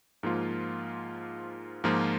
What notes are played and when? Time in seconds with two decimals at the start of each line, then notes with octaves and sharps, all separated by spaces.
0.23 G#2 F3 A#3 F4
1.84 G#2 F3 A#3 F4